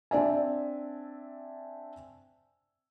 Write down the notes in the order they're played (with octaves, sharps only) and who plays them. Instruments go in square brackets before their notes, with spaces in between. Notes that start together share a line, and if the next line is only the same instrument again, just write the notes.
[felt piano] C4 D4 D5 E5 G#5